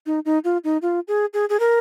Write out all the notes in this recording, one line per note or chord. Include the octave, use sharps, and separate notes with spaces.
D#4
D#4
F4
D#4
F4
G#4
G#4
G#4
A#4